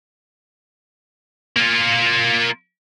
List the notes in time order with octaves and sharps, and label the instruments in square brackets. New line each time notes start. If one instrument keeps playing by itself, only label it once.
[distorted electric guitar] A#3 F4